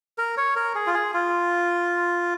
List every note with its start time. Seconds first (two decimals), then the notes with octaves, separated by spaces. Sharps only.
0.18 A#4
0.37 C#5
0.56 A#4
0.75 G#4
0.87 F4
0.94 G#4
1.14 F4